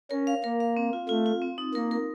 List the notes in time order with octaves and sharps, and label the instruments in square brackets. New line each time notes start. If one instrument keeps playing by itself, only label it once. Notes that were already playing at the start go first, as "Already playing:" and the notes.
[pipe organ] C#4 [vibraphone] A#4
[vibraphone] F5
[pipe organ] A#3 [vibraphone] A#4
[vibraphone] F5
C4
F4
[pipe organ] A3 [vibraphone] F4
[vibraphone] F4
C4
D#4
[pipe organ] A#3 [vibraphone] A#4
[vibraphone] A#4